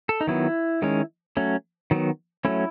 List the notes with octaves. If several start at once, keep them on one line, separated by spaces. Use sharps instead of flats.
A4
D#4
D#3 F#3 B3 E4
D#3 G#3 C#4
F#3 A3 C#4
D#3 F#3 B3
F#3 A3 C#4 E4